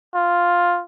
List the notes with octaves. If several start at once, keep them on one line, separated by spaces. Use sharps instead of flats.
F4